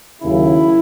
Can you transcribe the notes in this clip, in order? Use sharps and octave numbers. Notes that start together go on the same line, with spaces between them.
D#2 C#3 F#3 E4